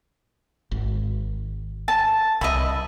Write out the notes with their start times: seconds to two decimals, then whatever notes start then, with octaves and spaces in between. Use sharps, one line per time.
0.71 G#1
1.88 A5
2.41 C2 D#5 E5 B5